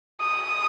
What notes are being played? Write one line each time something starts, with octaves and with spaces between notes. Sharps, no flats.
D#6